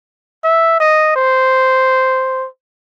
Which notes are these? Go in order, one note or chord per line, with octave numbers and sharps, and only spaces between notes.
E5
D#5
C5